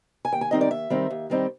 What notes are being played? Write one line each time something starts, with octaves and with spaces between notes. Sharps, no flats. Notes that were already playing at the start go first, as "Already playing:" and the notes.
G#5
D#2 G5
G#5
D#3 G3 C4 D#4 D#5
D5
D#2 E5
D#3 G3 C4 D#4
D#2
D#3 G3 C4 D#4